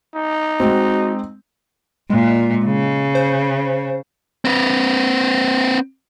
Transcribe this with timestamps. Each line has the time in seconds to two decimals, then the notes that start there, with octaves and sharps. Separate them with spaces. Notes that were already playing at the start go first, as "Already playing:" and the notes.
0.15 D#4
0.60 G#3 C4 F#4
2.10 A#2 G#3
2.65 C#3
3.15 C5
4.45 C4 B4